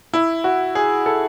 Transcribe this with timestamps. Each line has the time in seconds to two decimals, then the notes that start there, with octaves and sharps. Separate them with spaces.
0.13 E4
0.44 F#4
0.75 G#4
1.06 A4